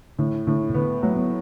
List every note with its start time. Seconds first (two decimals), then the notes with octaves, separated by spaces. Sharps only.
0.19 A2 D3
0.47 A2 D3
0.69 B2
0.74 D3 B3
1.03 F#3 A3
1.16 B3